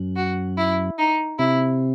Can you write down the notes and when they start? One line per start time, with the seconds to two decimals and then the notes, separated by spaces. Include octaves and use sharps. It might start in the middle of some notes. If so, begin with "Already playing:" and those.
Already playing: F#2
0.16 F#4
0.58 E4
0.98 D#4
1.39 C3 E4